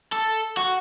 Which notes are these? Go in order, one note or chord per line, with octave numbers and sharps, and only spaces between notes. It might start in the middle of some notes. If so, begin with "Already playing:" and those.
A4
F#4